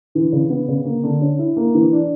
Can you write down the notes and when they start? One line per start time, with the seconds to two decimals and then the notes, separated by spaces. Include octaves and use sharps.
0.15 E3
0.32 C#3
0.50 B3
0.68 C#3
0.85 A#3
1.03 D3
1.21 C#4
1.39 E4
1.57 A#3
1.74 E3
1.92 D4